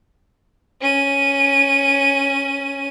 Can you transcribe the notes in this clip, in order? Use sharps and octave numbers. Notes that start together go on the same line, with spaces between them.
C#4 D#7